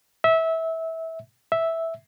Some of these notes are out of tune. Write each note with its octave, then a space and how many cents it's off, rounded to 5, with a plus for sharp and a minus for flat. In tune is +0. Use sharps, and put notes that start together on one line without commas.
E5 -20
E5 -5